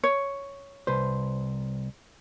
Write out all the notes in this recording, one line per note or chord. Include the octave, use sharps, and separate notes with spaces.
C#5
C2 B4 C5